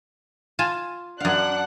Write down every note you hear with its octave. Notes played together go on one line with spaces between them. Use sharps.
F4 G#5 A5
F#2 D4 F5 F#5 F#6